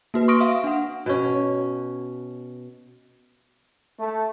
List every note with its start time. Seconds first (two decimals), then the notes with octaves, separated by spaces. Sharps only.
0.14 A#3 F#4 B4
0.28 C6 C#6 D#6 F6 A#6 D7
0.40 E5 F5
0.64 D4 F#5
1.06 B2 C#4
3.99 A3